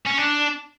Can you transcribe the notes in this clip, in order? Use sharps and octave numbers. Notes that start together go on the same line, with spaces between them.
C#4
D4